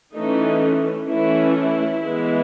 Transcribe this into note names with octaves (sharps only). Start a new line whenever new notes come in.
E3 A3 C#4 D#4
E3 A3 C#4 E4
E4
E3 G#3 B3 E4